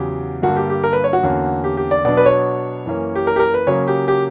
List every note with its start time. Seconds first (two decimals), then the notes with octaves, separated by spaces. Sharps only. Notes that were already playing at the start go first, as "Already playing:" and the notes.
Already playing: E2 C#3 F#3 G4
0.42 G2 D3 A#3 F#4
0.56 G4
0.70 G4
0.84 A#4
0.93 B4
1.04 C#5
1.13 F#4
1.23 E2 D3 A#3 C#4
1.64 G4
1.77 G4
1.91 D5
2.05 B2 F#3 B3 D4 D5
2.17 B4
2.26 C#5
2.86 F#2 E3 A#3 C#4
3.15 G4
3.27 A#4
3.36 G4
3.39 A#4
3.54 B4
3.67 C#3 F#3 A#3 C#4 C#5
3.88 G4
4.08 G4